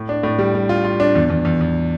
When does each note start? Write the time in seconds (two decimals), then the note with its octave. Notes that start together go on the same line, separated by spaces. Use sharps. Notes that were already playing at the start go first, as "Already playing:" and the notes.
Already playing: A2
0.09 D4
0.23 A2
0.39 G3
0.55 G3
0.69 F4
0.84 F4
1.00 D4
1.15 E2
1.30 E2
1.45 E2
1.61 E2